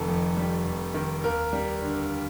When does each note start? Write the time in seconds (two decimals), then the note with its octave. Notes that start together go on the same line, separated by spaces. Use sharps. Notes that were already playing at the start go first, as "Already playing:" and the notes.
Already playing: F1 D#3 A4
0.08 F2
0.37 G3
0.65 F1
0.94 D#3
1.24 D#2 A#4
1.53 G3
1.82 D3